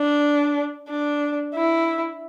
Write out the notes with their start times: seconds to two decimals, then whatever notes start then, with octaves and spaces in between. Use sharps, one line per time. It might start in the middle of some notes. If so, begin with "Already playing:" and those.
Already playing: D4
0.89 D4
1.55 E4